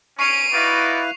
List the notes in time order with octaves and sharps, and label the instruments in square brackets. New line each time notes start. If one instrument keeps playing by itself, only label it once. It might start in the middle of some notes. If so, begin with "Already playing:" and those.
[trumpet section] C#4 [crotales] C#6 C7 F7 [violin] D7 D#7
[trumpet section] D#4 F#4 D5 [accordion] E4 B4 F5